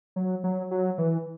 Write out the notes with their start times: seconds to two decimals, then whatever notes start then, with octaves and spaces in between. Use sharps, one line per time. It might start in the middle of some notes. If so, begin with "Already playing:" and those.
0.16 F#3
0.44 F#3
0.71 F#3
0.98 E3